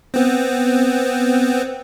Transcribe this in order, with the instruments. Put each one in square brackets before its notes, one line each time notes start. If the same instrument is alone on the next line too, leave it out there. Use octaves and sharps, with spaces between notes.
[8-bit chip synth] B3 C4